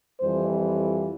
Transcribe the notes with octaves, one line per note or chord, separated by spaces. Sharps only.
F2 E3 G3 C5